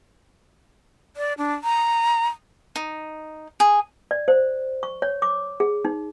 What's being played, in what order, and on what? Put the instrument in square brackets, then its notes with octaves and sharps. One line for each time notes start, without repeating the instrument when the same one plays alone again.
[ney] D5
D4
A#5
[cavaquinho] D#4
G#4
[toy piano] D5
C5
C#6
C#5
D6
G#4
D#4